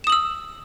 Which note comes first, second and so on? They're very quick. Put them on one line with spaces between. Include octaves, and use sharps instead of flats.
E7 D#6 F#7 E6